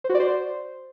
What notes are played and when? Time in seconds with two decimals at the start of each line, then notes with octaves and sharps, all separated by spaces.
0.04 C5
0.09 F#4
0.15 D5
0.20 C5